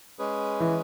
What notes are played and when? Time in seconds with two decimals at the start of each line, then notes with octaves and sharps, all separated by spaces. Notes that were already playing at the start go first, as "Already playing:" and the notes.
0.19 G#3 C#4 G#4 B4
0.60 E3